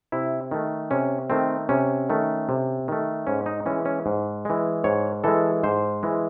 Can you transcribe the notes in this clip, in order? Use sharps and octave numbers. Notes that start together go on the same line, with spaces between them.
C3 E4
D#3 A3
C3 C#4
D#3 A3 C4
C3 C#4
D#3 A3
C3
D#3 A3
G#2 C#4
D#4
E3 G#3 C#4
C#4
G#2
E3 G#3
G#2 C#5
E3 G#3 A4
G#2 C5
E3 G#3